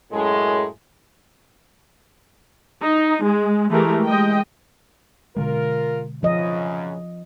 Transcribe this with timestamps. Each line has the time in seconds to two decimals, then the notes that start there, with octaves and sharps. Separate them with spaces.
0.12 F#2 A2 G#3
2.81 D#4
3.24 G#3
3.70 E3 G#3 A3 G4 A#4
4.05 G#3 D#5 G5
5.37 B2 D3 G#3 F4 A#4
6.23 F#2 C#3 F3 D#5